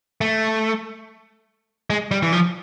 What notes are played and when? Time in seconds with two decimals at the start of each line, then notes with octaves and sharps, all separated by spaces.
0.21 A3
1.90 G#3
2.11 G3
2.23 E3
2.32 F3